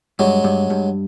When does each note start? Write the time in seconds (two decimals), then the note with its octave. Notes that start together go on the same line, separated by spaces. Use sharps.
0.19 G2 F#3 G#3
0.44 G2
0.70 G2